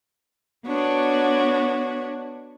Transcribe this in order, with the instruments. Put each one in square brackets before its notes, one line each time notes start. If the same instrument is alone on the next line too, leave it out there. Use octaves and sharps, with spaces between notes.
[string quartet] B3 D4 F#4 C#5